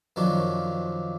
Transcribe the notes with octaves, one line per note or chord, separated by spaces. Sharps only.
F#2 D#3 F3 D4 C#6